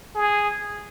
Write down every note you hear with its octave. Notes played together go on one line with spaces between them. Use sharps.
G#4